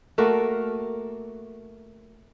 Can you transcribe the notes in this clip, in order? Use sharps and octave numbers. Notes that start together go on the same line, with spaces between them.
A3 A#3 F#4 A#4